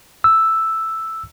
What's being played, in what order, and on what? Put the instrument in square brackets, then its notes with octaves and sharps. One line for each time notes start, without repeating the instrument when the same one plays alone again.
[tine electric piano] E6